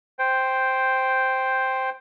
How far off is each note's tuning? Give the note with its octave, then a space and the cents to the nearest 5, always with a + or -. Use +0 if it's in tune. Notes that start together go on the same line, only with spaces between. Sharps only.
C5 +0 G5 +0